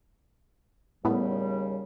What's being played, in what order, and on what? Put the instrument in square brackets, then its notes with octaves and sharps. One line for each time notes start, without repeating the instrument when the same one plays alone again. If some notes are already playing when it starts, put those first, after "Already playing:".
[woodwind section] D#2 C#3 G3 [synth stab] A2 B3